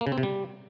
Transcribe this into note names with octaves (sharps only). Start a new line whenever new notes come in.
A#3
C#3
C4
C3
G3